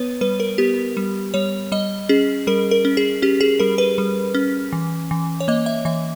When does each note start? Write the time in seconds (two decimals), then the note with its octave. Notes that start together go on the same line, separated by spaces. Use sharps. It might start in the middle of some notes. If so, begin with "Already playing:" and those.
Already playing: B3 B4 C#5
0.21 G3 B4
0.40 A#4
0.58 B3 G4
0.97 G3
1.34 G3 C#5
1.72 G3 D#5
2.09 C#4 G#4
2.47 G3 A#4
2.71 A#4
2.85 C#4
2.97 G#4
3.22 C#4 G4
3.41 G#4
3.60 G3 A#4
3.78 B4
3.98 G3
4.35 C#4
4.73 E3
5.11 E3
5.40 C#5
5.48 A#3 D#5
5.66 E5
5.85 E3 E5